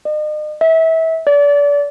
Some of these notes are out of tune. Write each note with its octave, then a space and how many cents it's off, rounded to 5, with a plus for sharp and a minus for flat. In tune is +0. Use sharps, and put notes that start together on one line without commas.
D#5 -40
E5 -30
D5 -35